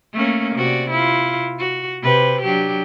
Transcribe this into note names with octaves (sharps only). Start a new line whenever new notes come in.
A3 A#3 C#4
C3 F#4 D5
E4 F4
F#4
C3 B4
F#3 D4 G4